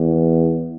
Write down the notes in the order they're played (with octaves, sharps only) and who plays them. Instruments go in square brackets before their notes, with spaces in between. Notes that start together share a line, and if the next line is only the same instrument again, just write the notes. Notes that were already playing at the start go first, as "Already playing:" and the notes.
Already playing: [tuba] E2